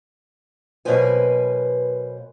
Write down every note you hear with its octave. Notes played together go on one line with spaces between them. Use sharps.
B2 F#3 A#3 B4 C5 G#5